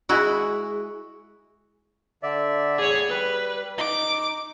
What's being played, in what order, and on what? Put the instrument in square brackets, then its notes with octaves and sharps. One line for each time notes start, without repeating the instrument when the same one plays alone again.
[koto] G#3 E4 F#4
[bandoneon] D3 D5 E5
[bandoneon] E2 A2 [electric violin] G#4 C#5
[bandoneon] G3 [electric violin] B4
[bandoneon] D#4 [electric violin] D6